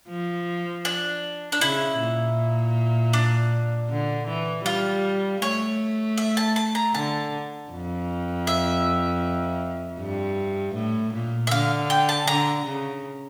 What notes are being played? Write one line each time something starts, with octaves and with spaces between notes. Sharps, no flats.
F3
D4
D4
C#3 E4
A#2
D4
D3
E3
G3 F4
A3 C#5
E5
A5
A5
A#5
D3 A5
F2
E5
G2
A2
A#2
E5
D3 F5
G5
A5
D3 A#5
C#3